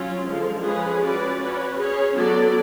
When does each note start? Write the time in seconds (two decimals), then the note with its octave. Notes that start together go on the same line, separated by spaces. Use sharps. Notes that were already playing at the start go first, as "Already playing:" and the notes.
Already playing: F#3 C#4 F4
0.27 D3 F3 G#3
0.64 F3 G#3 C#4 G#4 B4
1.02 C#4 F#4 B4 D5
1.39 C#4 F#4 B4
1.78 C#4 G#4 C#5
2.15 F#3 B3 F#4 A4 D5